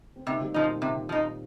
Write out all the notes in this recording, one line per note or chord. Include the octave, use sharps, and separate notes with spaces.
C4
C3 A#3 D#4
G3 C4
A#2 D#3 F3 D#4
A#2
C3
F3 D#4